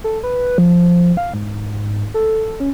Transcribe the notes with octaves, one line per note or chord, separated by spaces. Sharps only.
A4
B4
F3
F5
G#2
A4
C#4